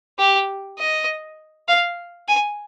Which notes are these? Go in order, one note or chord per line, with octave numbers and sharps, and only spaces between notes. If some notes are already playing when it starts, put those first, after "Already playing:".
G4
D#5
F5
G#5